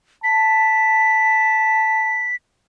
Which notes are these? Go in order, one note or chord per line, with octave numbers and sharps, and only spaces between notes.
A5 B6